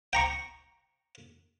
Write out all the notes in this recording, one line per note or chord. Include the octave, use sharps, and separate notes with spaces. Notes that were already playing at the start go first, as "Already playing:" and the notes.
G5 A#5 C#6